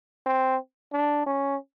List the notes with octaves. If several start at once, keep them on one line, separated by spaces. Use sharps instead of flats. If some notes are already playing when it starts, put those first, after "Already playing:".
C4
D4
C#4